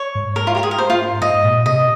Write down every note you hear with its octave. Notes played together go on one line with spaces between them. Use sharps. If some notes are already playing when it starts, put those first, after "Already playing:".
Already playing: C#5
G#2
A#4
F4
G4
G#4
A#4
C5
F4
G#2 D#5
A#2
C3 D#5